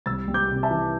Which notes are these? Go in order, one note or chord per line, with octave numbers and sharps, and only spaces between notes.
C2 E6 A6
G3
D6 G6
C3
E5 A5
E3